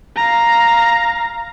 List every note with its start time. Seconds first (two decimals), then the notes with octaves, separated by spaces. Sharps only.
0.16 F5 A#5